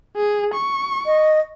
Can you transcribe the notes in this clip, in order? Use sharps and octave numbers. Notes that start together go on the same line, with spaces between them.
G#4
C#6
D#5